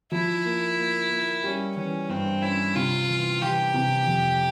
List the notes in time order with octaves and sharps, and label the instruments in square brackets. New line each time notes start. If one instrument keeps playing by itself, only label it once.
[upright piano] F3 [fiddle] E4
[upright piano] A#3
A#3
A#3
[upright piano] G3 [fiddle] C#4
[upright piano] E3 [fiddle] C#4
[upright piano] G2 [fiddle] C4
[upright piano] C#4 [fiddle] E4
[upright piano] C3 [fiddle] F4
[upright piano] E3
[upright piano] E3 [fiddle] G4
[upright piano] C3
F2